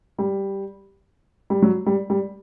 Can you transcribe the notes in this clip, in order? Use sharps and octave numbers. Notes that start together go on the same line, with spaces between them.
G3
G3
F#3
G3
G3